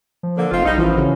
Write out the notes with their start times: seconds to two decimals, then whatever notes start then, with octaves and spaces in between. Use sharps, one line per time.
0.23 F3
0.36 D3 A#3
0.51 F1 C4 D#4 F4
0.64 B1 G3 G#3 D#4
0.77 A1 F#2 B2 E3 F3 E4
0.97 C#3 C#4